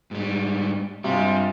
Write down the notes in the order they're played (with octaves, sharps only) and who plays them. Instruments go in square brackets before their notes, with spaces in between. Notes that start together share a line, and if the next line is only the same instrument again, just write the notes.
[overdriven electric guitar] G#2 G3
[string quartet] G2 G#3 F4 [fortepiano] C3 [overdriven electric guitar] G3